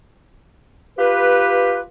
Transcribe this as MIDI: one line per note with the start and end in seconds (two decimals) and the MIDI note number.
0.99 1.82 65
0.99 1.82 67
0.99 1.82 71